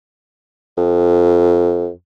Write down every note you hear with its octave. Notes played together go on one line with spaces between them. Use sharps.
F2